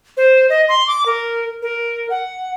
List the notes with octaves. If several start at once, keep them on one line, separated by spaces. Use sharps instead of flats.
C5
D#5
C6
D6
A#4
A#4
F#5